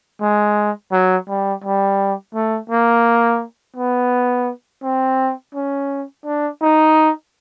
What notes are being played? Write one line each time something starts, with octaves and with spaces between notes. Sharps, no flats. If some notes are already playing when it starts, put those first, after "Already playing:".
G#3
F#3
G3
G3
A3
A#3
B3
C4
C#4
D4
D#4